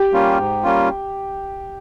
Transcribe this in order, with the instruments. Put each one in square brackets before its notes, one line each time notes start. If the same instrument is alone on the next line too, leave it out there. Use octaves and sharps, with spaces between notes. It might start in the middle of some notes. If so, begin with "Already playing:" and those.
Already playing: [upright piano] G4
[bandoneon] G3 A#3 C#4 F4
G#2
G3 A#3 C#4 F4